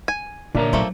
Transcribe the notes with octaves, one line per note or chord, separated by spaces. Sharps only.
G#5
A#2 D3 D4 A#4 C#5 E5 A#5
F3 F#3 A3 A#3